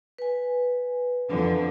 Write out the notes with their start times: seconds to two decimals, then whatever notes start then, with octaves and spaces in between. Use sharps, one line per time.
0.18 B4 G#5
1.30 F2 D3 F3